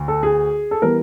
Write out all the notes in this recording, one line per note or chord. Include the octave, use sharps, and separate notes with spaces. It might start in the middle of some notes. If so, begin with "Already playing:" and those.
Already playing: D2
A4
G#4
A4
E3 G3 B3 A#4